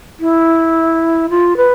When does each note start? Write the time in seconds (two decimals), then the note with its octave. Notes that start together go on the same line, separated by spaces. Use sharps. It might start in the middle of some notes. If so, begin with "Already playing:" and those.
0.20 E4
1.30 F4
1.57 B4